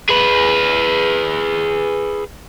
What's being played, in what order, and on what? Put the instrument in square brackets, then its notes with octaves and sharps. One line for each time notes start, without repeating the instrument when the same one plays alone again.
[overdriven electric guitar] G#4 B4